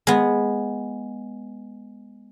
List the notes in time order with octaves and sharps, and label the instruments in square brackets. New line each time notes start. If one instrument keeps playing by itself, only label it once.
[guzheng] G#3 B3